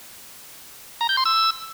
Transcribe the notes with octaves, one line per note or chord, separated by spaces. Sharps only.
A#5
G6
C6
E6